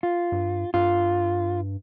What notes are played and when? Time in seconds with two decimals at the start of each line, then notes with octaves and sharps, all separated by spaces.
0.03 F4
0.32 G2
0.74 G2 F4